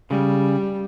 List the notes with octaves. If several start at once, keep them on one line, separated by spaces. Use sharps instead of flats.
C#3 G3